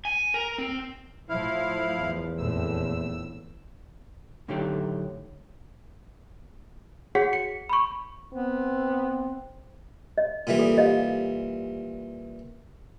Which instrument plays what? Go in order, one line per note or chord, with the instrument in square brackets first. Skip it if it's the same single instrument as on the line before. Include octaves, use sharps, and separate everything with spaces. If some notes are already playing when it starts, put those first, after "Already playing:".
[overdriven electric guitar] G#5
A#4
C4
[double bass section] A2 F3 [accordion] E4 F5
[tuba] E2
[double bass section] A#1 F2 A2 [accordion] E6
[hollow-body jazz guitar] A2 D3 D#3 F#3 A3 G4
[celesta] F#4 G#4 C#5 F#5 B6
C#7
B5 C#6
[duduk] B3 [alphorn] C4
[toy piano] D#5
[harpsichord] A#2 E3 G3
[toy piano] A4
G4 D#5 F5